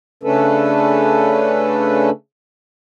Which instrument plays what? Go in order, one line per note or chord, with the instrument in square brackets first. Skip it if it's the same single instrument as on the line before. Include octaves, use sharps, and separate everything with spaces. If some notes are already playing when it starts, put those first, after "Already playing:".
[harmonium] C#3 A3 C#4 D4 A4 B4